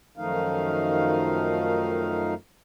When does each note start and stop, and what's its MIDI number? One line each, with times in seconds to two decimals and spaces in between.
0.17 2.34 42
0.17 2.34 51
0.17 2.34 53
0.17 2.34 57
0.17 2.34 63
0.17 2.34 77